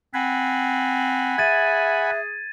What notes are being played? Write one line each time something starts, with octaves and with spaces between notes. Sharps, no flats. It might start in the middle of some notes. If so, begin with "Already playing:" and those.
C4 F#5 G#5 B5
G#4 E5 G#6 A6 D#7